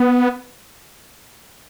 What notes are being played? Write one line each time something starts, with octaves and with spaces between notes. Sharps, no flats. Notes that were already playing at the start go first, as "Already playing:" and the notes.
Already playing: B3